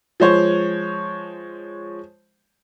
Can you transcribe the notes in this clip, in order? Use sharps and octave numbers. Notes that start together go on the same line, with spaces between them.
F3 G#3 C5 C#5